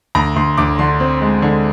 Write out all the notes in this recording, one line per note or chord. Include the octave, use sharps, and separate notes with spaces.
D2 A#5
D2 C6
D2 D6
D3 C6
C4
G#3
D3